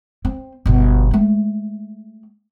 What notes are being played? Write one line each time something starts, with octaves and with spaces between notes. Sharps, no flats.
C4
G1 B2
G#3 A3